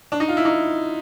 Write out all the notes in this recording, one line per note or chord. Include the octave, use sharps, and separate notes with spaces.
D4
D#4
F4
E4
D#4